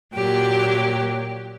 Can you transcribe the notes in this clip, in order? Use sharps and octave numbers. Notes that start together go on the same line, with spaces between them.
A#2 F#3 G4